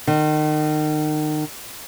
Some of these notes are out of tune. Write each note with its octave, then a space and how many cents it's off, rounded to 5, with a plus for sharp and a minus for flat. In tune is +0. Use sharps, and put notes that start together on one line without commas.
D#3 -30